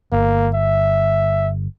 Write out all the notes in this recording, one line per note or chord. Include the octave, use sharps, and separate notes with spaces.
G1 A#3
E5